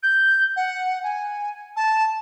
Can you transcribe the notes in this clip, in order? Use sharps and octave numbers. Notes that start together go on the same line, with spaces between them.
G6
F#5
G#5
A5